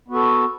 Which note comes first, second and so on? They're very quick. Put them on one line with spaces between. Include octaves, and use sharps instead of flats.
B3 F#4 A4